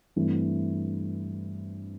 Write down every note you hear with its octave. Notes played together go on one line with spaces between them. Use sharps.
G2 E3 A3 C4